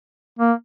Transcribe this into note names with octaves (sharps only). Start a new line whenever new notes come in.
A#3